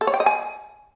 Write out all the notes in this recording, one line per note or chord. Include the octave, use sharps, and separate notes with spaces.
A4
C#5
G5
D#5
G#5